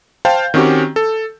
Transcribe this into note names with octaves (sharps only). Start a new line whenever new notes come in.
C5 F5 G5 A5 G6
D#3 C4 C#4 F#4 G4
A4